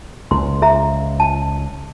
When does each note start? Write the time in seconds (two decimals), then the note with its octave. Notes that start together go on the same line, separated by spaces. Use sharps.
0.31 C#2 C6
0.62 G#4 E5 A#5
1.20 A5